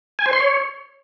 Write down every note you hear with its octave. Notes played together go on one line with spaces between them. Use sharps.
G#5
C5
C6
C#5